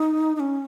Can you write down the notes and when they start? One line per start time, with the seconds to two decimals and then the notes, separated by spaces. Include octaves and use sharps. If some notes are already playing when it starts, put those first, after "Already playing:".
Already playing: D#4
0.36 D#4
0.40 C#4